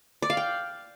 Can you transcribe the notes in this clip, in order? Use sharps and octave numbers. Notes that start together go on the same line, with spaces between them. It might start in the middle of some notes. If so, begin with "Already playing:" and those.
D5
F5
G5